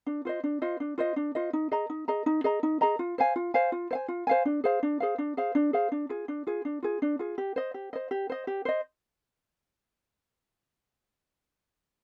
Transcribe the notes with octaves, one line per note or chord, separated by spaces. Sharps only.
D4
F4 C5 D#5
D4
F4 C5 D#5
D4
F4 C5 D#5
D4
F4 C5 D#5
D#4
G#4 D#5 A#5
D#4
G#4 D#5 A#5
D#4
G#4 D#5 A#5
D#4
G#4 D#5 A#5
F4
C5 F5 G#5
F4
C5 F5 G#5
F4
C5 F5 G#5
F4
C5 F5 G#5
D4
G#4 C5 F5
D4
G#4 C5 F5
D4
G#4 C5 F5
D4
G#4 C5 F5
D4
F4 G#4
D4
F4 G#4
D4
F4 G#4
D4
F4 G#4
G4
C5 D#5
G4
C5 D#5
G4
C5 D#5
G4
C5 D#5